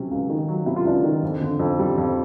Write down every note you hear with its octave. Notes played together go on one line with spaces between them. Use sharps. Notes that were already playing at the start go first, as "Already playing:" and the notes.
Already playing: C3 F#3 C#4
C#2
D#3
F#3
C3 E4
F4
C#2 D4 E4
D#3
F2
D3
F2
G3
F2